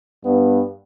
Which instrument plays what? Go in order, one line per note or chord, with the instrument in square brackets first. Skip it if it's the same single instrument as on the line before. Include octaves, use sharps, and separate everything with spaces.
[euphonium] G2 [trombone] B3